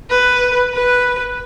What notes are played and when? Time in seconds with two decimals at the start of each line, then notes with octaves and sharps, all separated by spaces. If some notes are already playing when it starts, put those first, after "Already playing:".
0.10 B4
0.74 B4